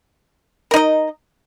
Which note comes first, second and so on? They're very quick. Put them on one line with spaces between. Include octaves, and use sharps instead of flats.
A#4 D#4 D#5